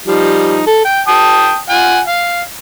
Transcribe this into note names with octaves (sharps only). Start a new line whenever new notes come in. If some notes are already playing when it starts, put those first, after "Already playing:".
F3 G3 D#4
A4
G5
G5 A5 D#6
F4 F#5 G#5
F5